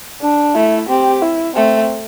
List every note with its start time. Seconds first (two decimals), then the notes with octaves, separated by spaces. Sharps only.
0.21 D4
0.55 A3 E4
0.89 C4 G4
1.22 E4
1.56 A3 C4